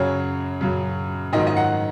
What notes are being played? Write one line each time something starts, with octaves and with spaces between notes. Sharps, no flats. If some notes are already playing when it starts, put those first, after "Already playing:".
Already playing: F#2 C#3 F#3 C#5
F#2 C#3 F#3
G#2 D#3 F#3 D#5
D#5
F#5